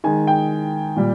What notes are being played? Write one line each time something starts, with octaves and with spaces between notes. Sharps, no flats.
D#3 G#3 G#5
G5
A#2 G3